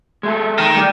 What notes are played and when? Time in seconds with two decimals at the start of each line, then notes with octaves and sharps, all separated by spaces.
0.23 G#3 A3 A4
0.58 D#3
0.77 G3 G5